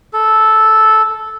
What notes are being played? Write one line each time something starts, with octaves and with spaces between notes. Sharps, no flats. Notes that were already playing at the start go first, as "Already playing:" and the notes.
A4